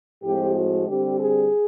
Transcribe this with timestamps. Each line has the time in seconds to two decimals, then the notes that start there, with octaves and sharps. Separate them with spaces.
0.22 A2 F3 G#3 C4 G4
0.54 F#4
0.86 D3 G3 C4 G4
1.19 G#4